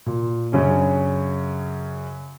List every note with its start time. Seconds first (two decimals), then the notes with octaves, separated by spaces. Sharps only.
0.06 A#2
0.52 F#2 C#3 C#4 D4